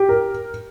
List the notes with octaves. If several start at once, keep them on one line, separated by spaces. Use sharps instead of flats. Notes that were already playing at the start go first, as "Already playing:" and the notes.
Already playing: G4
A#4